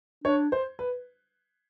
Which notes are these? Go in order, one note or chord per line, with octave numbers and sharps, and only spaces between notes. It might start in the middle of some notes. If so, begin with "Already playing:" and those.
D4 C#5
C5
B4